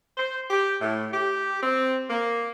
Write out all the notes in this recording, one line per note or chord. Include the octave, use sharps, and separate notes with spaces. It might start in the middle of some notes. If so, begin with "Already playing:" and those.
C5
G4
A2
G4
C4
A#3